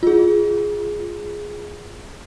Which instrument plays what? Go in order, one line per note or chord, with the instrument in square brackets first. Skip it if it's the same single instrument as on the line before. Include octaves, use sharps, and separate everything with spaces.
[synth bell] F4 G#4